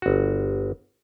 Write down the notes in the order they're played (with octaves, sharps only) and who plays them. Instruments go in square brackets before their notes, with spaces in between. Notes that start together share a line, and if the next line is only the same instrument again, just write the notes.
[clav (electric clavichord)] G1 F#4